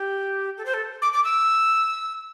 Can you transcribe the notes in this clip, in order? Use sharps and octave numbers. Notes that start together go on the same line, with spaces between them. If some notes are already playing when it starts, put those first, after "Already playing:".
Already playing: G4
A4
C5
A4
D6
D6
E6